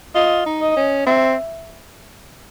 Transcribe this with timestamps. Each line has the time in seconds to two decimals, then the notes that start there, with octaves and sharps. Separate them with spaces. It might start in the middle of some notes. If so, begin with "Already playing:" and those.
0.15 F4 D#5
0.46 D#4
0.61 D#5
0.77 C#4
1.07 C4 E5